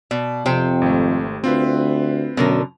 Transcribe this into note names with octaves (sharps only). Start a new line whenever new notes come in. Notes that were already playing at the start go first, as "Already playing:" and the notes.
B2 D5
F2 C3 C5 G5
G#1 A3
D2 C4 F4 B4
F#2 B2 D3 A#4